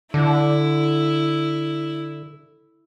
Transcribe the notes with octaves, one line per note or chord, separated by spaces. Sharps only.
D3 E4